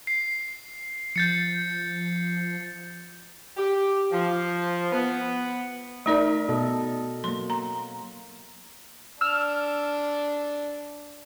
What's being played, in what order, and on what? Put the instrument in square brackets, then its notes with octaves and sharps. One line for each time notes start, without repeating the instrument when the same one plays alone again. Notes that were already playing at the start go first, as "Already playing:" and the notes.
[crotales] C7
[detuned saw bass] F3 [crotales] G6 A6 C#7
[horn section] G4
F3
B3
[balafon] A3 D#4 D5 [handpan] A#4 D#5
[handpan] B2 A4 D#5
[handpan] F#3 A#3 [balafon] C6
[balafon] A#5
[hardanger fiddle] D4 [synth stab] E6 F6